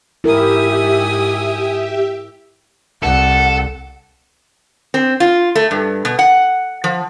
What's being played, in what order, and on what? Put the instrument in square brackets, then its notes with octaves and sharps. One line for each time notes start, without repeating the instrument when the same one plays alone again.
[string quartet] G#2 G#5 D#6 [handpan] E4 A#4 [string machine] G4 E5
[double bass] C2 [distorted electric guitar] A4 [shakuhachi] F#5
[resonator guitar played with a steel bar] C4
F4
A3
G2
B2
F#5
F3